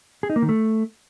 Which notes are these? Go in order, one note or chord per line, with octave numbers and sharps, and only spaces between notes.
G#4
D#4
A#3
D#3
A3